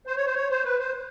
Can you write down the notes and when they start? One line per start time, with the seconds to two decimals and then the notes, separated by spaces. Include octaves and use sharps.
0.07 C5
0.17 C#5
0.26 C5
0.35 C#5
0.50 C5
0.64 B4
0.79 C5